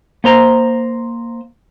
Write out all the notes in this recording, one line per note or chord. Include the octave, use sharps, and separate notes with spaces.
A#3 C5 A#5